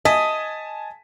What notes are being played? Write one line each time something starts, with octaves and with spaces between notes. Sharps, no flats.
D#5 G#5 A5 B6